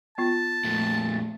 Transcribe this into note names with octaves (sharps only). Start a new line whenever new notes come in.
B3 F4 A5
F2 A#2 A3